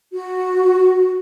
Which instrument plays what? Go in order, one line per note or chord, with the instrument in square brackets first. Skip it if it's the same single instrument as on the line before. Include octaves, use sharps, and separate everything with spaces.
[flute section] F#4